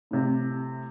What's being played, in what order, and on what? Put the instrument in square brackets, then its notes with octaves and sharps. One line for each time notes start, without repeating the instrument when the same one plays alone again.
[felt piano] A2 C3